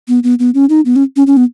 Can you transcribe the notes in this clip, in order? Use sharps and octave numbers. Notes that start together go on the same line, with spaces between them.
B3
B3
B3
C#4
D#4
B3
C#4
C#4
C#4
B3